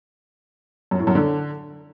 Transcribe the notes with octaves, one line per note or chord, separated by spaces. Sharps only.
F#2
A2
F#2
D3